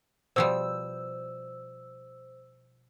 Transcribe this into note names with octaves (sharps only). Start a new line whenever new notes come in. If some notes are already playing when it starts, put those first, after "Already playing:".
B2 F3 G3 C5 E6